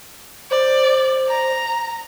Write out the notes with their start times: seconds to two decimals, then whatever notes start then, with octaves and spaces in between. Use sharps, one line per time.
0.51 C5 D5
1.28 A#5